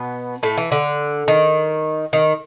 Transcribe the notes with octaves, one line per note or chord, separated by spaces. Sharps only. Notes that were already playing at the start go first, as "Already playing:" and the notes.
Already playing: B2 B3
A2 A3
E3
D3
D#3
D#3